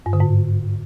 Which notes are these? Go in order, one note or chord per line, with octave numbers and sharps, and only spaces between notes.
G2
D3
G#2